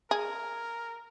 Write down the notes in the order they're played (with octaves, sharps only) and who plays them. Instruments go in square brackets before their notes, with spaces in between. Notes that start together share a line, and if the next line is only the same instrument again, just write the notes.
[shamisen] G#4 [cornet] A#4